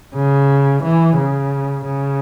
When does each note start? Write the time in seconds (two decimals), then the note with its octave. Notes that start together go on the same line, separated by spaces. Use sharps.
0.15 C#3
0.83 E3
1.17 C#3
1.85 C#3